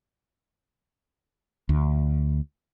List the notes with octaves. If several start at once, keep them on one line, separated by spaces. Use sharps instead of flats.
D2